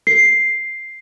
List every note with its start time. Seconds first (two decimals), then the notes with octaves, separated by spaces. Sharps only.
0.07 C7